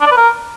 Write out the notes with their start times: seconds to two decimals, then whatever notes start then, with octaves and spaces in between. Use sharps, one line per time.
0.01 D4
0.06 D5
0.11 B4
0.17 A#4